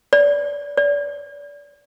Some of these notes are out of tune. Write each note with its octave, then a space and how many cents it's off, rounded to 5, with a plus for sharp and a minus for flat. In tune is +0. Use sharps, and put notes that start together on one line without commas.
D5 -25
D5 -30